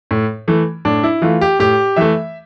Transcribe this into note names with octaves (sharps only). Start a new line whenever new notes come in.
A2
E3 A3
A2 D4
E4
E3 A3 F4
G4
A2 G4
E3 A3 E5